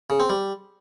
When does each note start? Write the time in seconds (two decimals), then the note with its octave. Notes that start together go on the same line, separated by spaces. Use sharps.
0.10 C#3
0.20 C4
0.30 G3